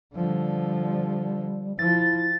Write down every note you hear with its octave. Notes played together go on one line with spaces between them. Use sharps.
D3 F3 G3
F3 E4 A6